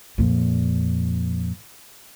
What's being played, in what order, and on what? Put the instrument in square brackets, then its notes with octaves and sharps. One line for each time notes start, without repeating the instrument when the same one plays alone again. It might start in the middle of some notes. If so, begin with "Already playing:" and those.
[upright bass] F2 A#2